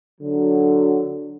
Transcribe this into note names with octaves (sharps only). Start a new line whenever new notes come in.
D3 F#3